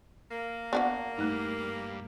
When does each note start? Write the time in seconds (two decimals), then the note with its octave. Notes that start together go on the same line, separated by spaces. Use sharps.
0.32 A#3
0.73 B3 D4 F#4
1.18 G2 A3 D#4